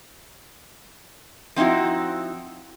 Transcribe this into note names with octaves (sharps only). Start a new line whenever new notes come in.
F3 C4 D#4 E4 F#4